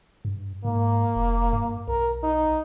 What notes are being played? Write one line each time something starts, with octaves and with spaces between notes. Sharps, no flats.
G2
G#2 A#3
F1
G2
B1 A#4
D#4